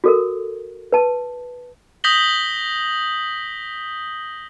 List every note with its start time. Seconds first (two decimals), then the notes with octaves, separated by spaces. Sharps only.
0.04 F#4 A4 A#4
0.92 B4 A5
2.04 D#6 G6 A#6 B6 F#7 G7